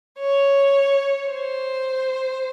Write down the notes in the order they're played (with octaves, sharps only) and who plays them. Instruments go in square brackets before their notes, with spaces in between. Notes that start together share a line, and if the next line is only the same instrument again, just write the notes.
[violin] C#5
C5